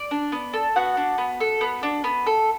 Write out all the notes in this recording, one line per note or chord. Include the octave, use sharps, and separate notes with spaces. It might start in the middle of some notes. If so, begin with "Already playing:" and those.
Already playing: D5
D4
B3
A4
B3 F#4 F#5
D4
B3
A4
B3
D4
B3
A4